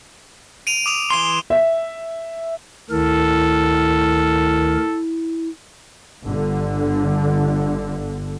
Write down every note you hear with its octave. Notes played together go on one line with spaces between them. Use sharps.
D7 D#7 F7
D6 D#6 F7
E3 G#4 C6 C7 G7
E5
D2 D#3 E4 A4 A#4
G1 D3